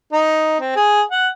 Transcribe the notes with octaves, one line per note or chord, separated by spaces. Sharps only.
D#4
C4
G#4
F#5